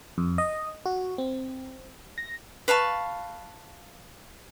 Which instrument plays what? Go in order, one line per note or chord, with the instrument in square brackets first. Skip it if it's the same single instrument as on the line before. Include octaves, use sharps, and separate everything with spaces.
[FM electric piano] F2
D#5
F#4
C4
A#6
[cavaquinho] B4 F5 A5 C#6